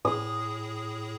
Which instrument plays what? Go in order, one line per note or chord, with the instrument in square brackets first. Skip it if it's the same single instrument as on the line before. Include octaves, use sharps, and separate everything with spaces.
[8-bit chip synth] A2 G#4 [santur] D#6